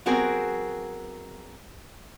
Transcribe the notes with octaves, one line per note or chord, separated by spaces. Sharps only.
F#3 B3 C4 F#4 G#4 A#4